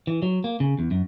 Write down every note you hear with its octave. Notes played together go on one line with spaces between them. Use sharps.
E3
F#3
A#3
C#3
E2
F#2